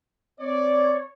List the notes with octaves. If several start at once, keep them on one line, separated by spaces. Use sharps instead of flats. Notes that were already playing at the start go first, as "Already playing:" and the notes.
C4 C#5 D5